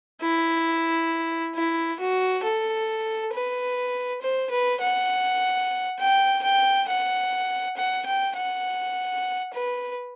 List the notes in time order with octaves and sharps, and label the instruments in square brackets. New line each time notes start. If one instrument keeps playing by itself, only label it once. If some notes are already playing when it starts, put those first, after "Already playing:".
[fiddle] E4
E4
F#4
A4
B4
C5
B4
F#5
G5
G5
F#5
F#5
G5
F#5
B4